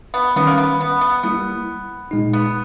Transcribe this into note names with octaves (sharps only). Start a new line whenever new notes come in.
B3
D#3 G3 B3 C#4
A#3
B3
B3
B3
G3 A#3 B3 E4
A#2 G#3 D#4
B3